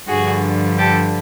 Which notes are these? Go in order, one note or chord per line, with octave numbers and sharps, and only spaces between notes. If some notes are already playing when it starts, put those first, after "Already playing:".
G2 D3 F3 F#4 G#4
G4 A4